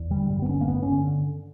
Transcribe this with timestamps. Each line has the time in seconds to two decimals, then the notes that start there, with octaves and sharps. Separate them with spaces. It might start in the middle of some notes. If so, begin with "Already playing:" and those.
Already playing: E2
0.10 D3 G3
0.29 G2 G3
0.42 B3
0.49 D3 C#4
0.61 A#3
0.68 G2 B3
0.82 D3 C#4